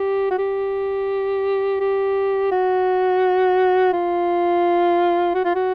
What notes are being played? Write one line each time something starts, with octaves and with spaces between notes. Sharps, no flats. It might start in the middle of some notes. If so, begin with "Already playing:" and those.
Already playing: G4
F#4
G4
G4
F#4
F4
F#4
F4
F#4